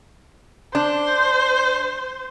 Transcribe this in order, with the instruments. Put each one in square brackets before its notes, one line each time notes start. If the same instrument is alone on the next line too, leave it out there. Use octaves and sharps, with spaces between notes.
[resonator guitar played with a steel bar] D4 [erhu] C5